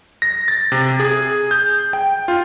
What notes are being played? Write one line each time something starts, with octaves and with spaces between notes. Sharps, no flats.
A#6
A6
C3
G#4
G6
G5
F4